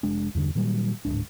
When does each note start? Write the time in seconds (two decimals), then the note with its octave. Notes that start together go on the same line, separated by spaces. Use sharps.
0.03 F1 G#3 D4
0.35 E2 G2 D3
0.55 A#2 D#3 F#3 G3
1.05 D1 A#1 G#2 D4